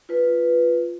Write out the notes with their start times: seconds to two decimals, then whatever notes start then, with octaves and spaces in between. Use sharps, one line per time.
0.09 F4 B4